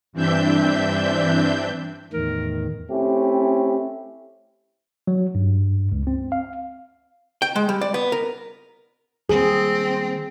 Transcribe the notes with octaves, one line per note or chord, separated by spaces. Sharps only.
G2 E3 C4 D4 E5 G6
E2 A2 D#3 A#4
A3 C4 C#4 E4 G4
F#3
G2
C#2
C4
F5
G5
G#3
G3
D5
B3
A#4
D#3 G3 A#3 C4 G#4